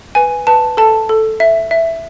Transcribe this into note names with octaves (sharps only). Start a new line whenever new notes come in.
B4 G#5
B4 A5
A4 A5
A4
E5
E5